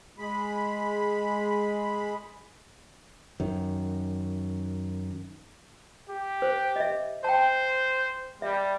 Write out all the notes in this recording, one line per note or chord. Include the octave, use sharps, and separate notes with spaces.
G#3 B5
F#2 D#3
G4
C5
D#5 E5
C5 G5 A5
G3 E5